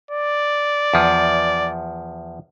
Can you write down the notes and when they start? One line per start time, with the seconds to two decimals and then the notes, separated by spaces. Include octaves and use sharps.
0.11 D5
0.94 E2 F3